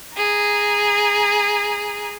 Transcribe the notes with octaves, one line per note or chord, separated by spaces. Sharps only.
G#4 A#5